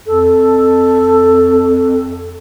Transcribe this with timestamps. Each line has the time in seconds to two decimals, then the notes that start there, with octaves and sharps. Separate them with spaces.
0.07 F2 A4